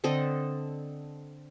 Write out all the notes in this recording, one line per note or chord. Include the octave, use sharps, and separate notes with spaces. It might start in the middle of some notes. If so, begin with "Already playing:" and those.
D3 C4 A4 D#5